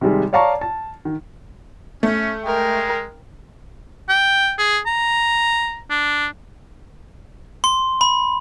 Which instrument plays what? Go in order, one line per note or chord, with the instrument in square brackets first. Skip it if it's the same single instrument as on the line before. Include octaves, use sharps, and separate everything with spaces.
[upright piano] C3 D#3 G3 G#3
C#5 D5 F5 A5 A#5 C#6
A5
D#3
[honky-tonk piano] A3 [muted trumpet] C#4
[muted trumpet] G#3 [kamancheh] A#4 G5
[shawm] G5
G#4
A#5
D4
[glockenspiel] C6
B5